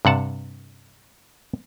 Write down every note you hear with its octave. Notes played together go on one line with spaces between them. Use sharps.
G2 C3 F#5 A5